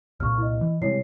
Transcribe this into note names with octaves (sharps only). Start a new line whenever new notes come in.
C2 A#2 C#6 F6
E4 D#5
E3
C3 G3 G#3 E4 C#5 C7